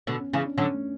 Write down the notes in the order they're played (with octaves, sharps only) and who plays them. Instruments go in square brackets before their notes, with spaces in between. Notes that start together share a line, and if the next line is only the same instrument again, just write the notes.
[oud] B2 D3 [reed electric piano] B3
[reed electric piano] C#4
[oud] C#3 E3 [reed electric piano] C#4
[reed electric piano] D4
[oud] D3 F#3 [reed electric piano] C#4
[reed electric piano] A3